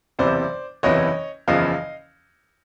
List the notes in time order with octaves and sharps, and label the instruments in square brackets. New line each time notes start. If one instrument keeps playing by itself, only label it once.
[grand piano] F#1 E2 C3 E3 C5 D5
F#1 E2 C3 E3 C#5 D#5
F#1 E2 C#3 F3 D#5 F5